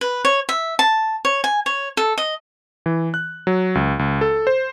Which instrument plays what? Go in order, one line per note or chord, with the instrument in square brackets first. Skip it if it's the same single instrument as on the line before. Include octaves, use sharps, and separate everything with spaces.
[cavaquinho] B4
C#5
E5
A5
C#5
G#5
C#5
A4
D#5
[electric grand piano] E3
F#6
F#3
C#2
C#2
A4
C5